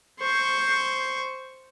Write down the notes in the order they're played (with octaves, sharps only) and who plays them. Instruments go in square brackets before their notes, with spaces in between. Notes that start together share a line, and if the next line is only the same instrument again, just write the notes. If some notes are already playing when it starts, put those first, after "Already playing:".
[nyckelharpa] C5 C#6